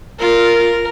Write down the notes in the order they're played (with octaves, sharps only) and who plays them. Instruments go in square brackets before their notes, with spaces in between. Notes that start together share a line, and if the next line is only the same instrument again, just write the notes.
[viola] F4 [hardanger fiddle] A#4